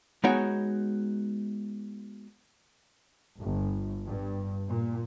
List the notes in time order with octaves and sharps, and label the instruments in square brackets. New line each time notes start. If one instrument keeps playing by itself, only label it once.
[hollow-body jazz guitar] G#3 B3 D#4 F#4 C#5 G5
[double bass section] G1
G2
A#2